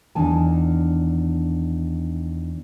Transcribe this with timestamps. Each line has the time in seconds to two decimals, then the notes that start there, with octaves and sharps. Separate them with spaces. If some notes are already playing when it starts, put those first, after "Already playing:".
0.15 E2 D#3 D4 G#5 A5